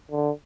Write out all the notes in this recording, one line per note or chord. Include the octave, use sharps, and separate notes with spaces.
D3